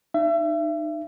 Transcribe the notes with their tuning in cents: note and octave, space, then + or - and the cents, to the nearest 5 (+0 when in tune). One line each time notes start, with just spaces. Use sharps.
D#4 -30 E5 +35